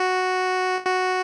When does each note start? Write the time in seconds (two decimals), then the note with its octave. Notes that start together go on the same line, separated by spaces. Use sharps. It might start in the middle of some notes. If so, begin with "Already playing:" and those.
Already playing: F#4
0.85 F#4